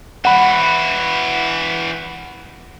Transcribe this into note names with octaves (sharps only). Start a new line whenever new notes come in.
E3 F#4 F#5 B5